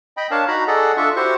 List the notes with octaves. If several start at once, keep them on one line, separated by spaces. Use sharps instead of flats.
D#5 G5 B5
D4 A#4 C#5 F5 A5
D#4 F#4 A#5 B5
G#4 A4 D5 D#5 F#5
D4 F4 A4 E5 C#6
E4 F#4 G4 C5 C#6